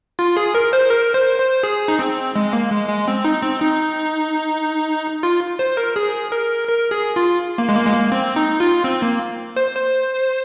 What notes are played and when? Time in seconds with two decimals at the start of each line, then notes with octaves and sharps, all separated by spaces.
0.19 F4
0.37 G#4
0.55 A#4
0.73 C5
0.90 A#4
1.14 C5
1.39 C5
1.63 G#4
1.88 D#4
1.99 C4
2.36 G#3
2.53 A#3
2.71 G#3
2.89 G#3
3.08 C4
3.25 D#4
3.43 C4
3.61 D#4
5.23 F4
5.59 C5
5.77 A#4
5.96 G#4
6.32 A#4
6.68 A#4
6.91 G#4
7.16 F4
7.58 A#3
7.69 G#3
7.76 A#3
7.87 G#3
7.93 A#3
8.12 C4
8.36 D#4
8.60 F4
8.84 C4
9.02 A#3
9.56 C5
9.75 C5